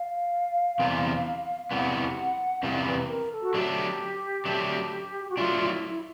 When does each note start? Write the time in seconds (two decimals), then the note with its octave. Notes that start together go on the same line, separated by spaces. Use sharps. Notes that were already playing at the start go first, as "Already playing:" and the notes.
Already playing: F5
0.79 E2 C3 E3 G3 B3
1.71 E2 C3 E3 G3 B3 F#5
2.63 E2 C3 E3 G3 B3 F5
2.85 B4
3.09 A#4
3.31 A4
3.43 F#4
3.54 F#3 A3 D4 G4
4.45 F#3 A3 D4
5.22 G4
5.30 F#4
5.37 F#3 A3 D4 F4
5.61 F4
5.68 E4
5.89 E4